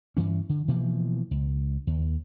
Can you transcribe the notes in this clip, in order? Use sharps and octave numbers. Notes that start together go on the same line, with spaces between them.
G2 E3 C#4
D3
B2 E3 F3 A#3
C#2
D#2